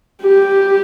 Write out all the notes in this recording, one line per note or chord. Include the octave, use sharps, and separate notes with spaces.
G4